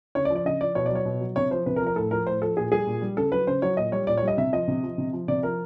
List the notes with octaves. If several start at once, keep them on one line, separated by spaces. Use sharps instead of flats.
C#3 C#5
D5
F3
D5
C#3 D#5
F3 D5
B2 C#5
D5
F#3 C#5
B2
F#3
C3 C#5
F3 C5
C3 B4
A#4
F3
A#4
A2 A4
F3 A#4
A2 C5
F3 A4
A#2 G#4
G3 G#4
A#2
G3
C#3 A4
F#3 B4
C#3 C5
F#3 C#5
A#2 D#5
G3 C#5
A#2 D5
C#5
G3
D#5
C3 E5
F3 D#5
C3
F3
C3
F3
C3 D5
F3 A#4